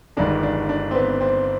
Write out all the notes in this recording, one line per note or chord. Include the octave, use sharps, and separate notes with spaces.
G1 G2 D#3 G#3 D4
D4
D4
C4
B3
C4